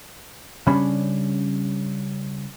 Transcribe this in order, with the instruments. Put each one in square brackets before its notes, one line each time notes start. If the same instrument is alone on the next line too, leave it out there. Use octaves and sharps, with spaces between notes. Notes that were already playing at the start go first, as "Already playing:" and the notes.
[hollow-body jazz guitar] C#3 G3 C#4 D4 B5